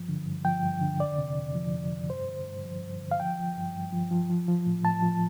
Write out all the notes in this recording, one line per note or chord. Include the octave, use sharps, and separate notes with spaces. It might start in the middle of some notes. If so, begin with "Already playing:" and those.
Already playing: G2 F3
D3
G2
F3 G5
G2
D3
F2 D5
C3
F2
F3
F2
C3
G2 C5
D3
G2
F3
G2
D3
F5
F3 G5
F3
G2
G2
F3
F3
F3
F3
A2
A2 A5
F3